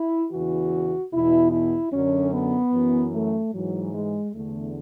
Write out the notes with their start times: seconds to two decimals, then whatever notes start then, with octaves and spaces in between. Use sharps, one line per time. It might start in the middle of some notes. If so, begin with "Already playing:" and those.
Already playing: E4
0.30 E2 C#3 E3 F#4
1.12 E2 B2 E4
1.51 E4
1.92 F#2 D3 C#4
2.33 B3
2.72 F#2 E3
3.13 A3
3.53 G#2 E3 F#3
3.93 G#3
4.34 E2 D3 A3